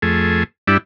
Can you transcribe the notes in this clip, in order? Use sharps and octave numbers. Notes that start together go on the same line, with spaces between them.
F2 A3 G#4
G2 G3 D4 E4